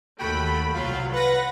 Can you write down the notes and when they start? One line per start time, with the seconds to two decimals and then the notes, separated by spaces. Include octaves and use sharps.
0.19 D#2 A3 F#4 G5 B5
0.74 C2 F#3 F4
1.13 B4 F#5 A#6